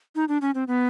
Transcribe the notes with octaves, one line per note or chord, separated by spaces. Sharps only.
D#4
D4
C#4
C4
B3